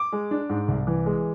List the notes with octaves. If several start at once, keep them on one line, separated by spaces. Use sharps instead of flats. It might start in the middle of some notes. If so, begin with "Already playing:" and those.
Already playing: D6
G#3
D4
G#2
C2
E3
G#3